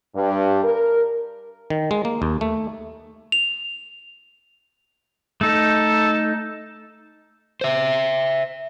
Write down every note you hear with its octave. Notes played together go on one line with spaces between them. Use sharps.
G2
A#4
D#3
G#3
A#3
D#2
A3
F7
A3 D#4 A4
C5 E5